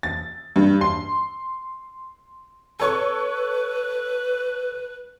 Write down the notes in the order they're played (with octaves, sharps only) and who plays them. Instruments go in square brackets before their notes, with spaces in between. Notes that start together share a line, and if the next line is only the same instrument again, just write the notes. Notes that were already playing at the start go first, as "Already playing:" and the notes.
[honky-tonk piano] A6
G2
C6
[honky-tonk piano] A4 C#5 C#6 [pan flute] B4